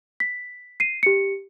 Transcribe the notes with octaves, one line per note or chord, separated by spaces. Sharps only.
B6
C7 D#7
G4 C#7